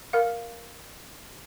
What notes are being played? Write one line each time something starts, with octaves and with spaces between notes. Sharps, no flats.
A#4 F5